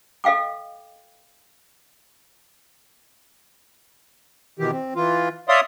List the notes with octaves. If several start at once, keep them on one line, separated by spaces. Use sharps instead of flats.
A4 D#5 F5 G5 D6
B2 D#3 E3 G4
C4
E3 F4
C#5 D5 E5 F5 C6 D#6